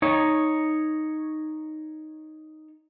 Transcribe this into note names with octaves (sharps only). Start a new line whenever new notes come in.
D#4 C#5